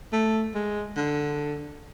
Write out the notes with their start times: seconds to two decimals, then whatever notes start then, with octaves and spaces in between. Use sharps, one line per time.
0.13 A3
0.55 G#3
0.96 D3